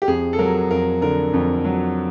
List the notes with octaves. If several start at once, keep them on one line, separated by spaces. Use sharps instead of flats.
G4
F2 G#4
A4
F#3 A#4
F2 A#4
D3 A#4
F2
F#3